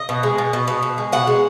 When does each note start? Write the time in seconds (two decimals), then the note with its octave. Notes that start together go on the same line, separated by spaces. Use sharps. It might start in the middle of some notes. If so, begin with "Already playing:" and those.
Already playing: D#5
0.09 B2
0.23 G#3
0.38 B2
0.53 B2
0.67 B2
0.83 B2
0.98 G#3
1.12 B2 F#5
1.27 G#3